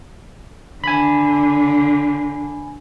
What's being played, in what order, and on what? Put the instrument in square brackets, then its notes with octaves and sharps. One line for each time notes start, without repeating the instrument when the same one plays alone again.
[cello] D3 [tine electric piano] G#5 B5